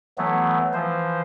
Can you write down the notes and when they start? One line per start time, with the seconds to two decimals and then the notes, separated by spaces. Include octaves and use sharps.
0.18 E3 F#3 A3 B3
0.73 E3 F3 C5